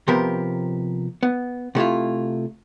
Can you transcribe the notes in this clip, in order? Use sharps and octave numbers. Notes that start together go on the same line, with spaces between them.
C3 F3 B3 G4 A#4
B3
C3 A3 E4 F4